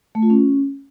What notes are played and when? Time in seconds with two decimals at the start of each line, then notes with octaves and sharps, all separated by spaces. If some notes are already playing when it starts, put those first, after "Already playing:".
0.15 A3
0.22 F4
0.30 C#4